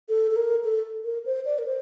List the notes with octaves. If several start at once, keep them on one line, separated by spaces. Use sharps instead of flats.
A4
A4
A#4
A4
A#4
C5
D5
A#4
C5